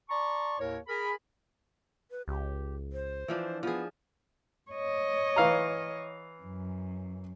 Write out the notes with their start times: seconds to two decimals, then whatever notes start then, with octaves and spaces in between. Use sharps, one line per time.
0.10 D5 A5 A#5 C6 C#6
0.59 D#2 A2 A#4 C#5
0.88 G#4 A#4 B5
2.11 B4
2.28 C#2 G4
2.92 C5
3.28 E3 F3 D4
3.63 F3 B3 G#4
4.72 C#5 D#5
5.36 E3 F5 A#5
6.43 F#2